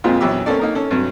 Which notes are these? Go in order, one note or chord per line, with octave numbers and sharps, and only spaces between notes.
F2 A#2 G#3 C4 F4
A#1 E2 F#3 G4 D6 E6
A3 A#3 C4 C#4 A4 D5
A#3 D#4 A#4
C#4 A4
G2 C3 F#3